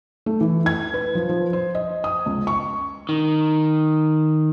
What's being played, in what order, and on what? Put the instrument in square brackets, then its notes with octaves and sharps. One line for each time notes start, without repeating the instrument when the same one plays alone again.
[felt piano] A3
E3
G#6
B4
F3
F3
C5
D#5
D#6
C#2
C#6
[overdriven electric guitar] D#3